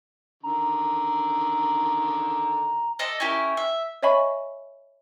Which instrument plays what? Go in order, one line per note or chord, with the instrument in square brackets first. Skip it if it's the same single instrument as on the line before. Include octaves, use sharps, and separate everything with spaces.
[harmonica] D3 D#3 [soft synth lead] A#5
[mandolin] A4 D5 D#5
C#4 E4 G4 A#4
E5
[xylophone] C#5 D#5 E5 G#5 B5 C#6